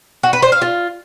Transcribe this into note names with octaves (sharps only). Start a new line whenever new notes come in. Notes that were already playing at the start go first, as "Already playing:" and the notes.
F#4
B4
C5
F5
F4